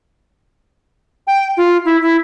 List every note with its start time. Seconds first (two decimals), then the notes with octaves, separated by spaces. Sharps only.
1.27 G5
1.57 F4
1.85 E4
2.02 E4